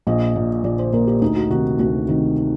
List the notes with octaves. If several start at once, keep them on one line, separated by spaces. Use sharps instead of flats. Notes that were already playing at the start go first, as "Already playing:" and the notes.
A#1 D#5
A#2
A#1 D5
C5
A#2 A#4
G4
D2 D#4
F#4
C3 D#3 F#4
D2 F#4
C3 D#3